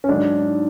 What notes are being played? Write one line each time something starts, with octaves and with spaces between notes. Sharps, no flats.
C#4
G#2 D#3 F#3 D4